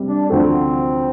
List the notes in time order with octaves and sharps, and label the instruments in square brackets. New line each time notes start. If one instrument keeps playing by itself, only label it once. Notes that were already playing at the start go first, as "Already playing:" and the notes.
Already playing: [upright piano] C3 G3
[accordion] D4
[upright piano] D2 D3 F3 A3 [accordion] C4